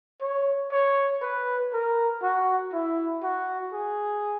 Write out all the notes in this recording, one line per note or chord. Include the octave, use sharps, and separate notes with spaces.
C#5
C#5
B4
A#4
F#4
E4
F#4
G#4